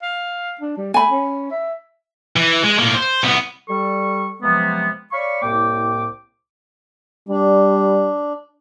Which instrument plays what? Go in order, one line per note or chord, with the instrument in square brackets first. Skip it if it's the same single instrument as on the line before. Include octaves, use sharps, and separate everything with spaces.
[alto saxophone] F5
D4
G3
[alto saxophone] A3 [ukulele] G#5 B5
[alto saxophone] C#4
E5
[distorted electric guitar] E3
G#3
A2 A#3
C5
C2 B3
[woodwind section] G3 A4 C#6
C3 F3 F#3 G#3 A#3 B3
C#5 D5 F5 B5 C#6
C2 A2 A#3 G4 G5 D6
[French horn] G3 [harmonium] D4